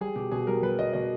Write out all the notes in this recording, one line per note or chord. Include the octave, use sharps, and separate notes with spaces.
G3 G#4
B2 G4
B2 G#4
G3 A#4
G3 B4
B2 D#5
B2 D#5